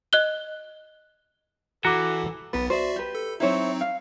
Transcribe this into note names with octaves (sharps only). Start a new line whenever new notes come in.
D#5 F#6 G7
E3 F#4 A4 F#5 A#5 D6
B1 B3 B4 A6
F#4 C5 D5 E5
G4 B4
A4
F#3 C4 D#4 E4 C5 C#5
F5